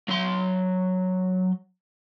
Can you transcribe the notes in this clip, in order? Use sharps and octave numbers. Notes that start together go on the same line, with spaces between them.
F#3 C6